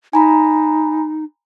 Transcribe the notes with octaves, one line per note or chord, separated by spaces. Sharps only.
D#4 G#5 A#5 B5